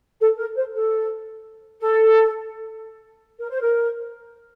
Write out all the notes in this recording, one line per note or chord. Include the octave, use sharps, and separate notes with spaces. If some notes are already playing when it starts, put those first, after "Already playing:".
A4
A#4
C5
A4
A4
A#4
C5
A#4